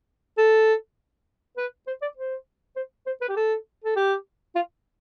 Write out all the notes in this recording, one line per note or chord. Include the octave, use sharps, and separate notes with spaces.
A4
B4
C5
D5
C5
C5
C5
B4
G4
A4
A4
G4
F4